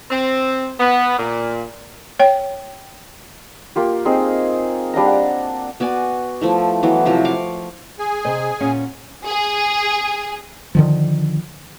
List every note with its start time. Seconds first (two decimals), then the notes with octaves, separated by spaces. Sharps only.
0.11 C4
0.79 B3
1.19 A#2
2.20 C#5 G5
3.76 A#3 F4 G4
4.05 C4 D#4 G#4
4.93 G3 D4 F5 A#5
5.06 F#5
5.80 B3 F#4 D5 G#5
6.41 F3 A3 E4
6.83 E3 F#3 B3
7.05 C3 F3 F#3 E4
7.25 F5 C#6 D6
7.99 G#4 G#5
8.25 C3 C5 D#5
8.60 A#2 C#4 F#5
9.24 G#4
10.75 D3 D#3 F3